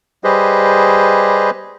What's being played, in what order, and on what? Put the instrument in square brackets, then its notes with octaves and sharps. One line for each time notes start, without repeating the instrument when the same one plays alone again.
[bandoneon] G3 G4 G#4 B4 C5 D#5